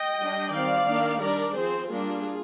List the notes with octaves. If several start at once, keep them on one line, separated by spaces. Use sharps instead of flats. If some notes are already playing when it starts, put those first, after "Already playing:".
Already playing: D#5 G5
G3 D4
D#3 G3 C4 D5 F5
D#3 A#3 D4
G3 D4 A#4 D5
F3 C4 G#4 C5
G3 A#3 D4 F4 G#4